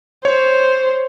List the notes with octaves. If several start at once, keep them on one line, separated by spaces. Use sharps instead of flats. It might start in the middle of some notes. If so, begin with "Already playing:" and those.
C5 C#5